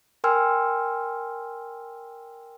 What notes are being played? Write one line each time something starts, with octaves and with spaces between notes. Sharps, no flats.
A#4 G5 G#5 C6 E6 F6